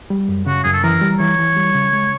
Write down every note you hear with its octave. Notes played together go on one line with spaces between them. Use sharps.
G3
F#2
C#3 F#4
F#2 G#4
A4
E3 A#4
G3
E3 C#5
E3
G3
C#3
G#3